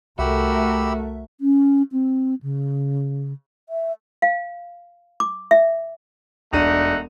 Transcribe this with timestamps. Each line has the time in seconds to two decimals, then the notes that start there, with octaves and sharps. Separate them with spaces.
0.19 C2 A3 F#4 G4 A#4 E5 B5 E6
1.41 C#4
1.92 C4
2.42 C#3
3.69 E5
4.22 F5
5.20 D6
5.51 E5
6.53 E1 A3 D4 D#4 F#5 D#7